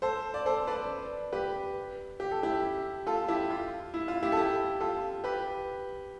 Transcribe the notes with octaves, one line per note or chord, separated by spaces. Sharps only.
A4 C5
D5
A4 C5
B4 D5
G4 B4
G4
A4
E4 G4
F4 A4
E4 G4
F4
E4
F4
E4 G4
A4
E4 G4
F4 A4
G4 B4